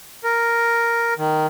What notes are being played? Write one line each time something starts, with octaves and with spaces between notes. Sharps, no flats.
A#4
D#3